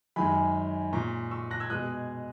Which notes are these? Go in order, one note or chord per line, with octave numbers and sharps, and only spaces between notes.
F#2 D#3 G#3 G#5 B5
A#2 G#3 A#5 C#6
C#6 E6
F#6 A#6
E6 G#6
B2 G#3 D#6 F#6